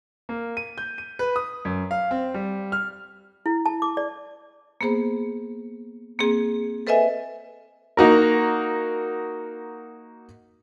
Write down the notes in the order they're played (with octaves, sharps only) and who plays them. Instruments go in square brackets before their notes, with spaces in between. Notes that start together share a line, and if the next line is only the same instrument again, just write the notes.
[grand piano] A#3
D#7
G6
D#7
B4
D#6
F#2
F5
C4
G3
F6
[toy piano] E4
A5
D6
D5
[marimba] A#3 B3 G#4 C5
A#3 C4 G#4
A4 B4 C5 D#5 E5 G#5
[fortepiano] A#3 D#4 F#4 A#4